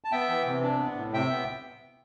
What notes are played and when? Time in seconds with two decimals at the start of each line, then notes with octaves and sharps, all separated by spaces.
0.04 A5
0.12 B3 E5 G5
0.29 E3
0.46 C3
0.62 D4
0.79 B3
0.96 A2
1.13 C3 E5 G5
1.30 B3